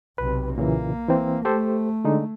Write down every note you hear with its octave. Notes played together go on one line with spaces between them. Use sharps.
B1 C3 B4
A#2 C#3 E3 A#3
E3 C4
A3 G4 A4 C5
D3 G#3 D#4